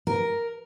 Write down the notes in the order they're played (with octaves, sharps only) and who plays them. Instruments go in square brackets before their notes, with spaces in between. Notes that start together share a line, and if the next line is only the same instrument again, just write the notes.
[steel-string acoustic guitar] A#4